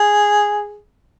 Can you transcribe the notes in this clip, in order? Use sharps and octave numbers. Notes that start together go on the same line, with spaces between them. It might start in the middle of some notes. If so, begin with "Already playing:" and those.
Already playing: G#4